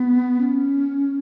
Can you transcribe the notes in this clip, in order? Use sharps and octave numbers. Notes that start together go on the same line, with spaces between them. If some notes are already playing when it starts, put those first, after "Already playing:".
Already playing: B3
C#4